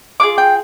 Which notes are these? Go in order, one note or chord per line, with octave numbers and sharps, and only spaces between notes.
D4 F4 G#4 D6
G5